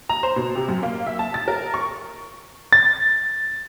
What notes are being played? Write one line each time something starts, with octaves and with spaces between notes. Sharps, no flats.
A#5
C5
B2
C3
F#2
A#3
E5
A5
A6
A#4
C#6
A6